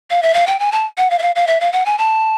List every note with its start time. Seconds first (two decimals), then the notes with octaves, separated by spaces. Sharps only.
0.10 F5
0.23 E5
0.34 F5
0.47 G5
0.60 G#5
0.72 A5
0.98 F#5
1.10 F5
1.19 E5
1.22 F5
1.36 F5
1.47 E5
1.61 F5
1.72 F#5
1.86 G#5
1.98 A5